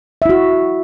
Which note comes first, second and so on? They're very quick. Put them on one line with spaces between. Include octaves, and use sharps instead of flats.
E5 E4 F#4